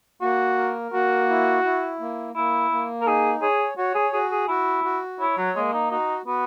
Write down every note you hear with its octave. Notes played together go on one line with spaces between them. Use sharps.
A#3 F#4
A#4
A#3 F#4
E4
E4
A#3
A#3 E4
A#3
A#4
D#4 G#4
G#4 C#5
F#4 C#5
G#4
F#4 G#4
G#4
E4 F#4
F#4
E4 C#5
F#3
G#3 A#3
D#4
D#4 F#4
B3 F#4